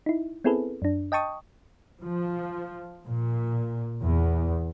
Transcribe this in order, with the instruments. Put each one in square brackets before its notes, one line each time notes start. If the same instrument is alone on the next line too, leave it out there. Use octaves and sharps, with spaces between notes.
[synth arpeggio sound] D#4 E4
B3 C4 E4 G#4 A4 B4
F#2 D4
D#5 G5 A5 C#6 D#6
[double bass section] F3
A#2
E2